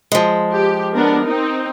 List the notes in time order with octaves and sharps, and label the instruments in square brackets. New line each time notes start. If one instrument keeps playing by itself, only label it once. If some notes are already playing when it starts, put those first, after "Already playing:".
[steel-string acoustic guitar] F3 G#3
[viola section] G4
B3 D4 A#4
C4 D#4